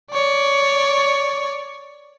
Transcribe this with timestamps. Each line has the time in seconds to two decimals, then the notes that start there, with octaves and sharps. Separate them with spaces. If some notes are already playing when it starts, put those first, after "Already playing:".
0.11 C#5 D5